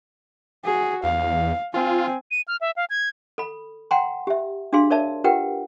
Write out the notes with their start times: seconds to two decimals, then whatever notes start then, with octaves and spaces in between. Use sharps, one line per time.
0.64 F#4 G#4
1.04 E2 F5
1.74 C4 F4 G#5
2.31 D#7
2.48 F6
2.61 E5
2.76 F5
2.90 G#6
3.38 A4 B5
3.91 F#5 G5 A#5 C6
4.27 G4 E5
4.73 D4 F#4 G#4 F5 C6
4.90 A#4 C#5 D5 E5 A5
5.24 F4 G4 A#4 B4 F#5 G5